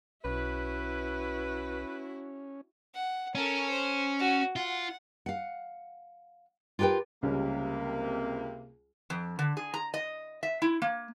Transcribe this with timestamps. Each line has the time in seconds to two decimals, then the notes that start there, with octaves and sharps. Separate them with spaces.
0.25 B1 C#4 E4 F#4 B4
2.95 F#5
3.35 C#4 A4 A#4
3.70 C5
4.19 F#4
4.56 F4 F#5
5.26 F5 F#5
6.79 F4 G4 A#4 B4 G5
7.23 C#2 C3 G3 A#3 C#4
9.10 F2
9.39 D3
9.57 G#4
9.74 A#5
9.94 D#5
10.43 E5
10.62 E4
10.82 A#3